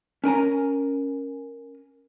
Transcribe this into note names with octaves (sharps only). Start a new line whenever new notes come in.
C#4 A#4 G#5 A#5